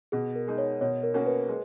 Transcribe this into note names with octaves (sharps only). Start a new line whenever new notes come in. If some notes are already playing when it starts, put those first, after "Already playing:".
B2 G#4
A#4
G#3 D#4
C#5
B2 C#5
A#4
A#3 C#4 F#4
B4
G#3